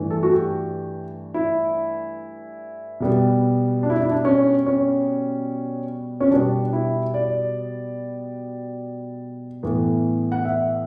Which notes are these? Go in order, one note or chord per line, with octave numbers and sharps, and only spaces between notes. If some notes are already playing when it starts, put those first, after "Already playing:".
Already playing: G2 E3 A3
A4
F#4
G4
E4
B2 G3 B3
D4
E4
D4
E4
D4
C#4
C#4
C#4
B2 G3 B3 D4
E4
D5
A2 E3 B3
F#5
E5